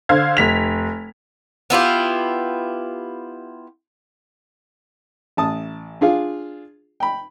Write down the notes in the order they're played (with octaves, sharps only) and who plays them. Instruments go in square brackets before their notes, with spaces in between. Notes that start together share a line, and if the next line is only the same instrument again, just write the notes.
[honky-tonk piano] D3 C5 F5 G#6
F1 B6 F7
[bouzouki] B3 E4 F4 G4
[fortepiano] A1 A5 D#6
D4 F4 G#4 F5
G5 B5